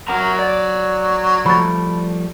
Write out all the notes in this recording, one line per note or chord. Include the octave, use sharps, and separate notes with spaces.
F#3 A#4 F#5 A#5
D5
F3 G3 A3 B5 A6